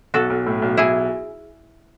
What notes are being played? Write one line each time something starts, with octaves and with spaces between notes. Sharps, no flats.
B1 F#4 A4
B1
A2
B1
B1 E4 G#4